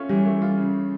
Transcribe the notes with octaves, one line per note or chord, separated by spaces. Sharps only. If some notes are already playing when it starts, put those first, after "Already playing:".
Already playing: A3 C#4 F4
E3 G3 G4
A3
F4
C#3